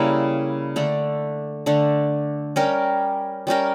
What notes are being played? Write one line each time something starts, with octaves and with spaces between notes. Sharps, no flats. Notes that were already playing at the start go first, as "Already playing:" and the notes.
Already playing: C#3 G3 A#3 E4
D3 A3 D4
D3 A3 D4
G3 C#4 G4 A#4
G3 C#4 G4 A#4